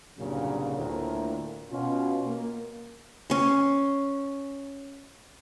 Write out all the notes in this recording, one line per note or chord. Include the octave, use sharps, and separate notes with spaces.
C2 G2 A#2 C#3 F#3
D2 A2 D3 A#3 F4 A#4
B2 C#4 F4
A#3
C#4 C6